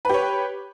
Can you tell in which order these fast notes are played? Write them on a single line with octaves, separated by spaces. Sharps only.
B4 G4 C#5